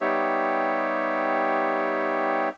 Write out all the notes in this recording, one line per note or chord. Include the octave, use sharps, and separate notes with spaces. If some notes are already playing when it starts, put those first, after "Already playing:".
G3 B3 D#4 G4 C#5 E5